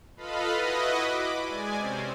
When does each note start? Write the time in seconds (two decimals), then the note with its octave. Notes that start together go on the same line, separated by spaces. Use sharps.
0.17 F4 A4 B4 D#5 F5 B5
0.55 E4 F#4 B4 D#5
1.07 B5 D6
1.45 G#3 D5 G#5
1.78 C3 C4 C#4 C5